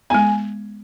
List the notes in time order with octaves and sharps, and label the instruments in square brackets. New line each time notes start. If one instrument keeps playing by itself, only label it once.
[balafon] G#3 B3 [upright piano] G#5